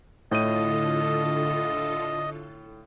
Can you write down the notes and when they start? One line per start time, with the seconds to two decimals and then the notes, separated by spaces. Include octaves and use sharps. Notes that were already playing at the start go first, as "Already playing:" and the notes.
0.31 A2 D3 E4 F4 A4 C#5 D#5 D#7